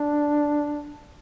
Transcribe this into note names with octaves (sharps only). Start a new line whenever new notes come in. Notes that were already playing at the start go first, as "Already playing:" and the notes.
Already playing: D4